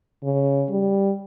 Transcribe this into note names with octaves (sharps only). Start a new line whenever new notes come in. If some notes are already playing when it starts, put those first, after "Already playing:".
C#3
G3